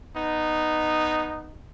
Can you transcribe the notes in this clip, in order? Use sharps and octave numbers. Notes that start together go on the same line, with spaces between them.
B3 D#4